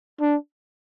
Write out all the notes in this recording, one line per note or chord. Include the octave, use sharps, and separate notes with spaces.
D4